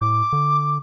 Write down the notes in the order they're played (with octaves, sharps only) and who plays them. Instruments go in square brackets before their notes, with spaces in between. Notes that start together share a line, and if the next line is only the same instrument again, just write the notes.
[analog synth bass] A2 [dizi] D6
[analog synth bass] D3